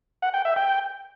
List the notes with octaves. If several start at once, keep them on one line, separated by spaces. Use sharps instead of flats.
F#5
G5
E5
G5